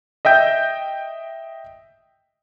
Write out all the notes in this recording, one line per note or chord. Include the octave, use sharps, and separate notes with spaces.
D#5 E5 G5 G6